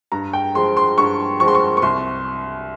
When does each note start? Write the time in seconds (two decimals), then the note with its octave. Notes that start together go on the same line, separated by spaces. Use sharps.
0.12 G2 A#5
0.33 G5
0.54 F3 G#3 C6
0.77 C6
0.98 G2 C#6
1.40 F3 G#3 C#6
1.48 C6
1.55 C#6
1.77 C#6
1.82 C2 C6